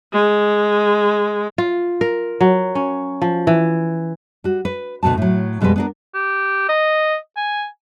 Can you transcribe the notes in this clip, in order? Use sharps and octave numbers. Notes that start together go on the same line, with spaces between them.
G#3
F4
A#4
F#3
C#4
F3
E3
G3 F#4
B4
D2 B2 B3 F#4 A5
A2 F#3
F2 B2 G3 G#3 B4
B3 D4 A#4
G4
D#5
G#5